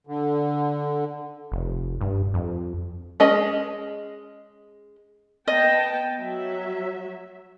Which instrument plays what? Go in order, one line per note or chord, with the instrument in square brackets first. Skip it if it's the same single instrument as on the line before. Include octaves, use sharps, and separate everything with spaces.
[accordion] D3
[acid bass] F1
G2
F2
[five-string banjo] G#3 C#4 G#4 D#5
[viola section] B3 G5 A5 [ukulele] D#5
[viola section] F#3 E5